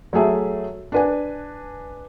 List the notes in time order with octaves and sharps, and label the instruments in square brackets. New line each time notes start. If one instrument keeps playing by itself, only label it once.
[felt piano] F#3 A3 G#4 E5
D4 B4 G#5